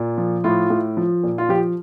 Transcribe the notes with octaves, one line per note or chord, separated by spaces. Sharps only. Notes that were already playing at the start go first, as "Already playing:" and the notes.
Already playing: A#2
F3
A2 F4
A2
F3
A#2
F4
F3 G4